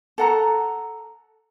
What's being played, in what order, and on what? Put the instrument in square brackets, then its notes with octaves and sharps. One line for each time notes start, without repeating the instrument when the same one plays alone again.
[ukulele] A4 F#5 A#5